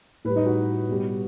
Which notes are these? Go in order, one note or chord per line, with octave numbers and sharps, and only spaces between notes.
A2 G3 B4
D#4
F#4
B2 G3